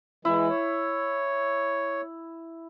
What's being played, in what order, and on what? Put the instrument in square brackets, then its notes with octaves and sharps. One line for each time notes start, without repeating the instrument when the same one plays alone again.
[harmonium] E3 G#3 [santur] E4
[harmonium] C#5